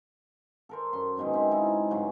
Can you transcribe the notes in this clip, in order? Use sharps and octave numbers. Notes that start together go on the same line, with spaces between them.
A4 A#4 C5
F#2 C6
G#2 B2 D#3 G#3
C4 E5
D#4 E4 G#5
G2 C#3 F#3